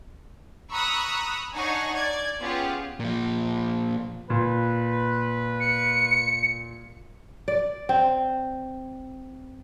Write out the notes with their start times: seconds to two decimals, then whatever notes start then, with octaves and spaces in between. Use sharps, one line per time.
0.70 A#5 B5 C#6 D#6 E6 F#6
1.54 D4 D#4 C#5 F#5 G#5 C#6
1.94 D5 G#6
2.39 B3 C#4 F4 G4 G#4
3.00 A#2 F3
4.30 A#2 B4
5.60 C#7
7.48 D5
7.89 C4